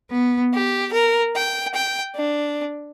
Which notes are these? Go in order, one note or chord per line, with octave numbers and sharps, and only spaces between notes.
B3
G4
A#4
G5
G5
D4